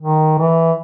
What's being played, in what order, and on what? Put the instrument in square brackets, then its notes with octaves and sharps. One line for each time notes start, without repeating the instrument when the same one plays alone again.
[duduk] D#3
E3